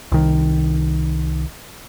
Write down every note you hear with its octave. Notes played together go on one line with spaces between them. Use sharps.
C2 D#3